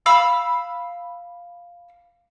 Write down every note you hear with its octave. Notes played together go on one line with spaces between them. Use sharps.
F5 B5 E6